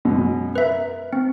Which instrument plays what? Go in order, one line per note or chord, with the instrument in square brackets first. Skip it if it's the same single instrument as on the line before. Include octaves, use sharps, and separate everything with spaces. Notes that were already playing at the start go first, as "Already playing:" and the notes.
[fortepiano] F#2 B2 G#3
[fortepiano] A#4 [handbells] B4 E5
[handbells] C4